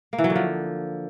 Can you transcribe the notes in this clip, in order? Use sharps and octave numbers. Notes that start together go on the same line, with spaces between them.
A#3
E3
F#3
D3
F3